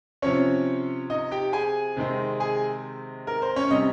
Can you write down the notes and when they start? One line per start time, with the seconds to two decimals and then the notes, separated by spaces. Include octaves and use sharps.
0.22 C3 F3 C4 C#4 C#5
1.10 D#4 D#5
1.31 G4 G5
1.53 G#4 G#5
1.97 C3 D#3 G#3 C4
2.40 G#4 G#5
3.27 A#4
3.42 C5
3.56 C#4 C#5
3.71 C3 G3 C4 D#4 D#5